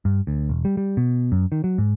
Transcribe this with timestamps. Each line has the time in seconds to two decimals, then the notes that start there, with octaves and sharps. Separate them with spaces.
0.05 G2
0.27 D2
0.49 E1
0.65 G3
0.77 G3
0.97 B2
1.32 F#2
1.52 D#3
1.64 F#3
1.78 G#2